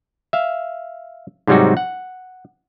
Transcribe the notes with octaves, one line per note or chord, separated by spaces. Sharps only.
E5 F5
G#2 C3 F#3 G3 D#4 F#4
F#5